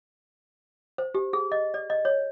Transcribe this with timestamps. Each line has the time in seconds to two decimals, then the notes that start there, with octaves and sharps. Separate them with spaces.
0.98 C5
1.15 G4
1.33 G#4
1.52 D#5
1.74 D5
1.90 D#5
2.05 C#5